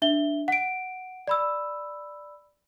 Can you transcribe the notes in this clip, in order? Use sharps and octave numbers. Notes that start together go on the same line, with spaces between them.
D4 E5 G7
F#5 D7
D5 B5 E6